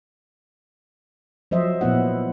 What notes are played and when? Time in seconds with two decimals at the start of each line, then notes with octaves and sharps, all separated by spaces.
1.51 F3 F#3 C5 D#5 E5
1.81 A#2 F3 B3 E4 F#5